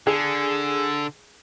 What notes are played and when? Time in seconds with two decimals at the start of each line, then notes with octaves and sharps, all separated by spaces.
0.07 D3 G#4